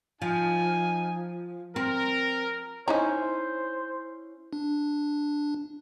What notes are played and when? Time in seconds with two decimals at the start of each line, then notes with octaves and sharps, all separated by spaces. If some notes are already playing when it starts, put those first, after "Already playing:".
0.22 F3 D#4 G#5
1.76 C4 A#4
2.88 C#4 D#4 E4 C5 A#5
4.53 D4